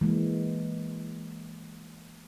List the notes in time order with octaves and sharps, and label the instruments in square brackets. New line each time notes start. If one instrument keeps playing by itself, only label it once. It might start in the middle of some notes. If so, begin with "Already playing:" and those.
[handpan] E3 G#3 A#3